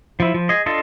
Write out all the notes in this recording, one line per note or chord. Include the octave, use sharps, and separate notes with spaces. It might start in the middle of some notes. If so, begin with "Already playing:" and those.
F3 E4
F3
G#4 D#5
D4 F4 A4 D#5